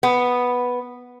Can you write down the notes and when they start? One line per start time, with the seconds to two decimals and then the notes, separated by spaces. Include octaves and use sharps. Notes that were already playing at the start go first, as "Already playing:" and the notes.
0.03 B3